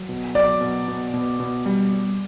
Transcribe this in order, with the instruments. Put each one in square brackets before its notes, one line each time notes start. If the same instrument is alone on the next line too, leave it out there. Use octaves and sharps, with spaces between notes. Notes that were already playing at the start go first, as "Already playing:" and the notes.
Already playing: [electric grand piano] F#3
B2
[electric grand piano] F#3 [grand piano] D5
[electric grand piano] B2
B2
B2
B2
G3
G3